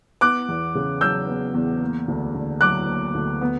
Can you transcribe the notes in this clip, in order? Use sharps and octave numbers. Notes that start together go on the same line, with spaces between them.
B3 D6 F#6
E2
C#3
F#3 E6 G6
B3
E2
A#3
D2
D3
F#3 D6 F#6
A#3
D2
B3